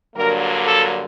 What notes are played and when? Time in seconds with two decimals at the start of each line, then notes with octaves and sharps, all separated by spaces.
0.14 G2 D3 F#3 A#3 A#4
0.66 A4